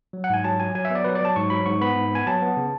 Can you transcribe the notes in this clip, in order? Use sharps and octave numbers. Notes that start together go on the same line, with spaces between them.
F#3
F#5
G#2 G#5
F#3 A5
F#3 G#5
F#3 G#5
E5
B3
D5
F#3 B4
D5
F#3 A5
G#2 C#6
F#3 B5
G#2 C#6
B3 B5
G#2
B3 G#5
F#3 A5
B3
C#3